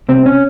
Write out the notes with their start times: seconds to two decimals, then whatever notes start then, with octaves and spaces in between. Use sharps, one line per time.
0.09 C2 C4
0.26 C#4